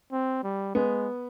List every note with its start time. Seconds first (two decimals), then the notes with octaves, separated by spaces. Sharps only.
0.12 C4
0.44 G3
0.75 G#3 B3